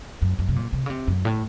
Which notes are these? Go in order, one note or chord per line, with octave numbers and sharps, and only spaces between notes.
F#2
F#2
C3
A#2
C3
C#3
C3
F#2
A2